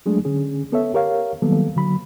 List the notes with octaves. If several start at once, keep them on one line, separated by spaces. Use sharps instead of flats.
F#3 G#3 A3 D4 G#4
D3 C#4 G#4
B3 A4 C#5 E5
G4 A#4 C#5 F5
D#3 F#3 G3 A#3 B3 A4
D3 F#3 B5